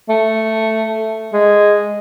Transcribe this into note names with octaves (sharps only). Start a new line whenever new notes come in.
A3
G#3